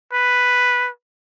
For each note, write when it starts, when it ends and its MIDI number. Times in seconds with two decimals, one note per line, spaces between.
0.13 0.89 71